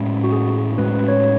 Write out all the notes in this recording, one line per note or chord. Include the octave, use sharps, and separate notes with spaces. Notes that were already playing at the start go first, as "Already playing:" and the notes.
Already playing: A2 G#3 C#4
F#4
G#4
A2 G#3 C#4 B4
C#5